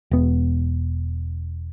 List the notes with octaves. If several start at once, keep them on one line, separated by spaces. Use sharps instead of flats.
E1 B3